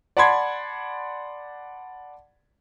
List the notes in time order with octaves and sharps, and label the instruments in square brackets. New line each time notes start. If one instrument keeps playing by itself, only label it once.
[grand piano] D5 F#5 A5 B5 C6 G#6